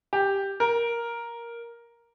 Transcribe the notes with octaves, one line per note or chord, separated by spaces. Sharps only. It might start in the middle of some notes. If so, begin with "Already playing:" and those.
G4
A#4